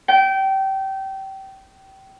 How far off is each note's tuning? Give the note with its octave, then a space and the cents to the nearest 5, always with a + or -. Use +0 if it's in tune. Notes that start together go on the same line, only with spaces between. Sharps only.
G5 -25